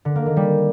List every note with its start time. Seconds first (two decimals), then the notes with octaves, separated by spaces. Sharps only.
0.05 D3
0.16 A#3
0.26 D#3
0.37 G3